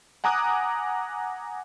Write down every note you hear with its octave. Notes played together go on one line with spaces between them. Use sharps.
F#5 G#5 A#5 D6 D#6 F#6